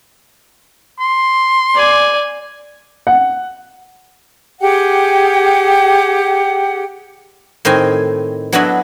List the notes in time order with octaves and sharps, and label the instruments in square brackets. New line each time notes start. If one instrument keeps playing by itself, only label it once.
[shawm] C6
[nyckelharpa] D5 G#5
[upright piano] F#5
[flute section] G4 G#4 F#5 G5
[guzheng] A2 D#3 C4 D#5 G#5
F#3 B3 D4 E4 F#4 D#5